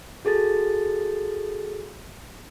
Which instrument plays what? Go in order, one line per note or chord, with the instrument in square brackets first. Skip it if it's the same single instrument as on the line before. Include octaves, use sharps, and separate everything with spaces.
[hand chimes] F#4 G#4 A4 A6